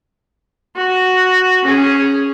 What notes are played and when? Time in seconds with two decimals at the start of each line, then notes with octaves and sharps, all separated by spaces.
0.77 F#4
1.64 C#4 G#4